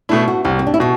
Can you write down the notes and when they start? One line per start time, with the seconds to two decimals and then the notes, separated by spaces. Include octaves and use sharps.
0.09 B2 A3 D4 E4
0.28 F#4
0.44 C2 G4
0.59 C4
0.67 D4
0.74 E4
0.80 B2 F#4